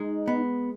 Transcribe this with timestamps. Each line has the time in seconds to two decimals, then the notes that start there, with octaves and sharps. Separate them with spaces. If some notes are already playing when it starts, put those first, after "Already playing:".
Already playing: G#3 D#4
0.28 B3